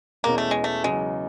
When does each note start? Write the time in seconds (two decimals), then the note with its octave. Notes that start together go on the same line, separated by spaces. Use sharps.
0.24 E2 B2 G#3 A#3 C#4
0.38 A3
0.51 G#3
0.64 A3
0.83 E2 C#3 F#3 G#3